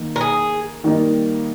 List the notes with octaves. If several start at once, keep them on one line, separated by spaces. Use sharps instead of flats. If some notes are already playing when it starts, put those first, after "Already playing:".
Already playing: D#3 A#3 D#4
A#4
G#4
D#3 G3 A#3 D#4